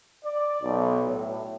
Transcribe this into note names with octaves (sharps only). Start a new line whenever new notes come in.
D5
B1
A2